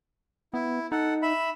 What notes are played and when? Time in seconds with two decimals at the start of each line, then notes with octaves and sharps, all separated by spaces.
0.54 B3 E4
0.92 D#4 A4 F#5
1.22 E5 B5